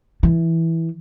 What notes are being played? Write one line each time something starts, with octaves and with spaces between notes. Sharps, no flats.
E3